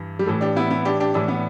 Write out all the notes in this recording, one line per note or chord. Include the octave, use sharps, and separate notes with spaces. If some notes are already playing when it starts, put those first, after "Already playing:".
Already playing: G2 E3
G3
A2 E3 A3
D4 G4
B3 E4
B3 E4
D4 G4
D4 G4
A2 E3 D4
B3